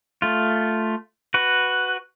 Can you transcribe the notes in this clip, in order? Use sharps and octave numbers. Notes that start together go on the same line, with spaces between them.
A3 F4
F#4 B4